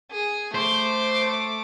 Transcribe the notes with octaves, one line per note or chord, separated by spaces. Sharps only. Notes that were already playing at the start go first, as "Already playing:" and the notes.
G#4
A3 C5 D6